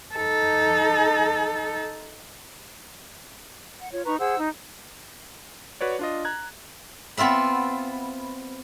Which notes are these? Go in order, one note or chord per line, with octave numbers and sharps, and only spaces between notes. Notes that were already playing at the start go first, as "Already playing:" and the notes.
D#4 A4
F#5
F4 C#5
D#4 B4 A#5 C#6
G#4 C5 F#5 E6
D#4
F#4 B4 C#5 D5
D4 F4 D#5
A#5 F#6 G#6
B3 C4 F4 E5 B5